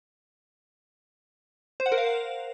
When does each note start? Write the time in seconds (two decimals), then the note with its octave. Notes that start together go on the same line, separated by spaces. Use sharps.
1.80 C5
1.86 F#5
1.92 A#4
1.98 F5